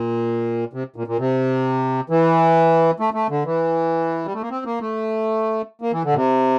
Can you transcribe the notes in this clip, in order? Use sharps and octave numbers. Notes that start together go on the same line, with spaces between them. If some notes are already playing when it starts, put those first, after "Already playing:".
Already playing: A#2
C3
A#2
A#2
C3
E3
A3
A3
D3
E3
G3
A3
A#3
C4
A#3
A3
A#3
E3
D3
A#2
C3